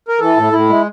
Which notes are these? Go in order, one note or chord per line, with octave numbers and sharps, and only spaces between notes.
A#4
E3 A4
A2
A2 E4
G#3